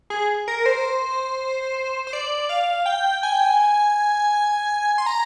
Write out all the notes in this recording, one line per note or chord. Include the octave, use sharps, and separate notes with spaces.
G#4
A#4
C5
C5
D5
F5
G5
G#5
G5
G#5
C6
A#5